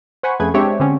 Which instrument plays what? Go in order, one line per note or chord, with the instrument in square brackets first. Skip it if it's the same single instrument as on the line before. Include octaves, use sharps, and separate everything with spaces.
[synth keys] C5 F#5 G#5 B5 C#6
F2 A3 C#4 G#4 B4 G#6
G#3 C4 D4 G4 C#5 E5
D3 C4 C#4